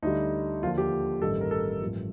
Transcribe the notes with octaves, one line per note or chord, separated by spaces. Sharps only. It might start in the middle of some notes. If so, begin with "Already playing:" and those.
D2 D3 G3 D#4
D#2 D3 F3 F4
G4
A1 G2 D#3 G3 A4
A#4
A4
A1 G2 F3